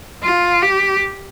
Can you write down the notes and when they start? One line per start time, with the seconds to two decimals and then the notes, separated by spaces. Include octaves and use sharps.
0.23 F4
0.62 G4